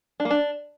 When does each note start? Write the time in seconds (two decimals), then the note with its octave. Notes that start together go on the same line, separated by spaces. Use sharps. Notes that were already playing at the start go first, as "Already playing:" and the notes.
0.20 D4
0.25 A#3
0.30 D4